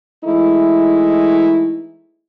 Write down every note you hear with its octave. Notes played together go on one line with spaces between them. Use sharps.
E3 G#3 A3 D#4 E4